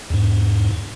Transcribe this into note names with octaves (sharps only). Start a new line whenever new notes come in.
E2 G#2